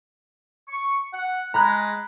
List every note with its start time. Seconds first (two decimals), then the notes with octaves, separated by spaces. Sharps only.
0.68 C#6
1.14 F#5
1.54 G#3 A#5 B5 F#6